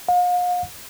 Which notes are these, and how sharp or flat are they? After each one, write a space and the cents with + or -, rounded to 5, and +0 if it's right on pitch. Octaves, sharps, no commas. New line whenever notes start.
F5 +40